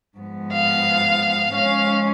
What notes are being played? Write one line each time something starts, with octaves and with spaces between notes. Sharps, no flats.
G#2 F3 B3
F5
G#2 F3 G#3 C#4 F5